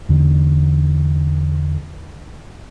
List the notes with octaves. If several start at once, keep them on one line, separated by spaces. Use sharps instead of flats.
E2 D3